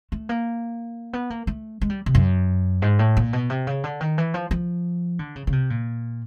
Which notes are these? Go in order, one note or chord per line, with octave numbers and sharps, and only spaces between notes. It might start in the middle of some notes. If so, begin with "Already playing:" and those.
A3
A#3
B3
A#3
A3
G#3
G3
C3
F#2
G#2
A2
A#2
B2
C3
C#3
D3
D#3
E3
F3
F3
D3
C#3
C#3
C3
A#2